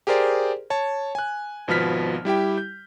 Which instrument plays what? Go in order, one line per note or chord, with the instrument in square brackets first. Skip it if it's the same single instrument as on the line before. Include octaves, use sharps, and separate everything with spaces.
[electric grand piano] G4 G#4 A#4 C5 D5
C#5 A5
G#5 F#6
G#1 B2 F3 B3 F6 B6
G3 E4 G4 G5
G6